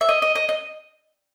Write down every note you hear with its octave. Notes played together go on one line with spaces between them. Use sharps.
E5
D#5
D#5
D#5
D#5